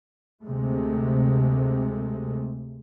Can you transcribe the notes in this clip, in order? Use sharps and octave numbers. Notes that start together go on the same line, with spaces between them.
D2 C3 G#3 A3